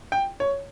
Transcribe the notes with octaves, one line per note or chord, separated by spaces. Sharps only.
G5
C#5